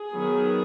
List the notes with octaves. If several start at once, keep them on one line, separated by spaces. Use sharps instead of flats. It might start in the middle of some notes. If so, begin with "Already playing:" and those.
Already playing: G#4
D#3 F#3 B3